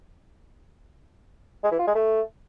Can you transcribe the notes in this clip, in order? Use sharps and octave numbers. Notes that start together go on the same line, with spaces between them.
G#3
E3
F4
G#3
A3